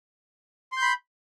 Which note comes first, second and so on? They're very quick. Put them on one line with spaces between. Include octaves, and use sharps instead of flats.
C6 G6 B5